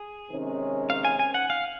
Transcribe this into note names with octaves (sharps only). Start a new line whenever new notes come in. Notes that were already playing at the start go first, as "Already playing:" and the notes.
Already playing: G#4
C3 D#3 G#3 C#4
F5
G#5
G#5
F#5
F5